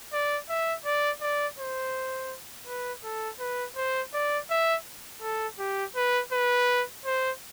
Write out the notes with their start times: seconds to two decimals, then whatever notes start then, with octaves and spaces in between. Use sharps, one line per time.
0.13 D5
0.49 E5
0.85 D5
1.21 D5
1.59 C5
2.67 B4
3.04 A4
3.40 B4
3.76 C5
4.13 D5
4.50 E5
5.22 A4
5.59 G4
5.96 B4
6.32 B4
7.05 C5